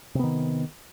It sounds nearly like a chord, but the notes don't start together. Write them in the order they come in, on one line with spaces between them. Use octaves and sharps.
C3 B3 D#3